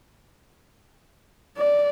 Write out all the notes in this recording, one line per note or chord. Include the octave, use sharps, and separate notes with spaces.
D5